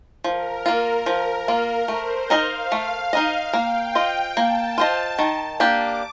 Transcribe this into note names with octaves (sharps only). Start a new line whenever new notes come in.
F3 A#4
A#3 F4
F3
A#3 F4
A3 C5
D#4 A#4 D#5 F5
A3
D#4 A#4 D#5
A#3 G5
F4 C5 D#5
A#3 A5
F4 C5 D#5
D#3
A#3 D4 G4 D6